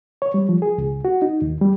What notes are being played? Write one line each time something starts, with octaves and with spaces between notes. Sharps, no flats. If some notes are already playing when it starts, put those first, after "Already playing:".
C#5
G3
F3
G#4
C#2
F#4
D#4
D#2
G3